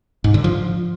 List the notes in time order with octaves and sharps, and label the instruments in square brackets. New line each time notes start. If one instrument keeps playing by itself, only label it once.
[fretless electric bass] G#2
D3
F3